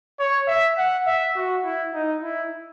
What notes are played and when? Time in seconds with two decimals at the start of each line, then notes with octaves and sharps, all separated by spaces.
0.19 C#5
0.48 E5
0.78 F#5
1.07 E5
1.36 F#4
1.64 E4
1.94 D#4
2.23 E4